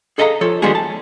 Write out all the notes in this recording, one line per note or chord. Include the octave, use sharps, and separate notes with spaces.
G#4 A4 D#5 F5 A5 A#5
F3 A4 C#5
D#3 G3 G#3 B3 F#4 G#4
A5